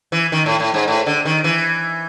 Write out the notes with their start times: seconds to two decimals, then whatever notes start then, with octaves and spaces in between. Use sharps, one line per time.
0.12 E3
0.32 D#3
0.46 A2
0.60 A2
0.74 G#2
0.88 A2
1.06 D3
1.25 D#3
1.44 E3